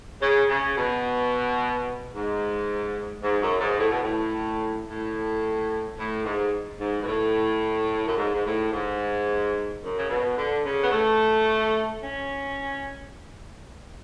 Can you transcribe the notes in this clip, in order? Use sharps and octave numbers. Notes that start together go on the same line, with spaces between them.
C#3
C#3
B2
G#2
G#2
F#2
G#2
A2
B2
A2
A2
A2
G#2
G#2
B2
A2
F#2
G#2
G#2
A2
G#2
F#2
C#3
B2
D3
C#3
B3
A3
C#4